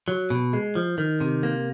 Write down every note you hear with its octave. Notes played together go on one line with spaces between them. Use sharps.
F#3
B2
G#3
F3
D#3
C3
A#3